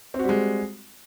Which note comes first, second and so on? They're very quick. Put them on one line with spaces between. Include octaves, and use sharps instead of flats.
C4 F#4 G3 G#3